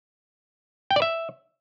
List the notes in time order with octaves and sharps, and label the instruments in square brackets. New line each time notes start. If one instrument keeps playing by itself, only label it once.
[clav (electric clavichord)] G5
D5
E5